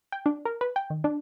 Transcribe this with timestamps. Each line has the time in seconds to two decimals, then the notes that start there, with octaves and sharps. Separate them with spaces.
0.12 G5
0.26 D4
0.45 A#4
0.61 B4
0.76 G5
0.90 D#3
1.04 D4